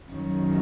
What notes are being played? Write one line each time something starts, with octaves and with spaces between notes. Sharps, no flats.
F#2 D#3 F#3